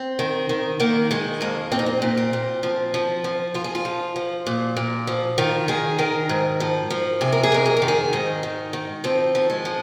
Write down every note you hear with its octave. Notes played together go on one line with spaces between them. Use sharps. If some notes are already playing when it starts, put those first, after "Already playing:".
Already playing: C4
D#3
D#3
D#3 A#3
D#3 G#3
F2 A#3
A#2 C4
D#4
C4
A#2
C4
A#2
F3
F3
F3
F3 F4
G#4
F4
F3
F3
A#2
A#2
F3
D#3 F4
D#3 G#4
D#3 A#4
G#2
F3
F3
C3 G#4
A#4
G#4
F2 A#4
G#4
A#4
D#3
G#4
G#2 D#4
D#3
D#3
F3 C4
F3
G#3
F3